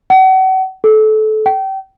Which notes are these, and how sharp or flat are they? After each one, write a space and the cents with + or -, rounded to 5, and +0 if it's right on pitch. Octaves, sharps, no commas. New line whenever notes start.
F#5 +35
A4 -25
G5 -30